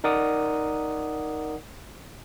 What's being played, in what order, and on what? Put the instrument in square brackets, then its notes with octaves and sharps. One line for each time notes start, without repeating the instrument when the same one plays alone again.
[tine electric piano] D#4 A#4 D5 F#5 D#6